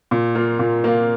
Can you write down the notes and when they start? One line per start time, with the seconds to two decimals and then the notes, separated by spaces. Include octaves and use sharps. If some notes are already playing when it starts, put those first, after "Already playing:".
0.11 A#2
0.35 A#3 F4
0.59 A#2
0.84 A#3 F4